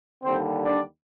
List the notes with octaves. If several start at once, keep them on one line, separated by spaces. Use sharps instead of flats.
D#2 D3 G3 C4 C5
D4 D5